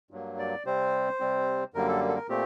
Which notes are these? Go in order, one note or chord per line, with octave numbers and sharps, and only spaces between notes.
G2 F#3 A#3
D5
C3 G3 C4 C5
C3 G3 C4
F#2 D3 G3 A#3 A#4
A4
A4
A#4
A#2 A3 C4 G4